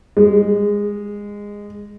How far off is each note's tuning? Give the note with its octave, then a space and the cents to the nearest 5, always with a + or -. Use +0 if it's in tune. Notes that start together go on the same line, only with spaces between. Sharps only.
G#3 -15